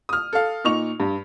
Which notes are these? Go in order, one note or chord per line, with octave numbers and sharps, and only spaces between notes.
D#6 F6
A4 F5
A#2 D#4 C#6 F7
G2